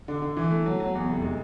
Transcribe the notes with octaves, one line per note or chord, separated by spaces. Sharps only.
D3
D3
E3
A3
F#3
F#3
E2
F1
G#3